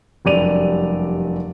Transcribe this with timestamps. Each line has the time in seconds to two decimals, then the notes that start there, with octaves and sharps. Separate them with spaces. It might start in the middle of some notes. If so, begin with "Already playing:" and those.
0.25 F1 F#2 G3 D5 D#7 F7